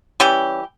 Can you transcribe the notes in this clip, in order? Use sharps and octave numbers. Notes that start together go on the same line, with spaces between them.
E3 G3 C#4 G4